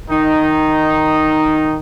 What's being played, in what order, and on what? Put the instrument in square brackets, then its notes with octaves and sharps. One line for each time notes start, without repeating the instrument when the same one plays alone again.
[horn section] D#3 D#4